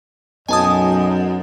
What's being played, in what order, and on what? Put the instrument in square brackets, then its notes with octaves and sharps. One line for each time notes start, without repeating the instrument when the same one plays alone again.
[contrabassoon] B1 [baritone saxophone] F#2 [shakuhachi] D#5 [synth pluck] G#5 A5 D#6